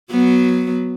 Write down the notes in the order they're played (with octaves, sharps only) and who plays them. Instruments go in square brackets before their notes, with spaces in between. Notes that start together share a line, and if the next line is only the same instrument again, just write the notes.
[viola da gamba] F#3 B3